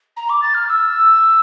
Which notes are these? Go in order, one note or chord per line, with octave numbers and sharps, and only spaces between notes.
A#5
D6
A6
F6
F6
E6